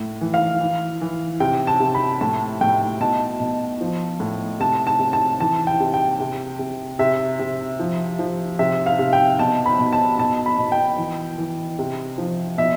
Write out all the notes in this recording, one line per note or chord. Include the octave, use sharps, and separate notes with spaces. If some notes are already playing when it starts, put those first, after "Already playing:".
Already playing: A2
E3
F5
E3
E3
C3 G5
A5
C3
B5
A2 A5
A2 G5
B2 A5
B2
F3
A2
C3 A5
A5
C3
A5
E3 A5
G5
C3
G5
C3
C3
C3 E5
C3
F3
F3
C3 E5
F5
C3
G5
B2 A5
B5
B2
A5
B2 A5
B5
B2
G5
E3
E3
C3
F3
B2 E5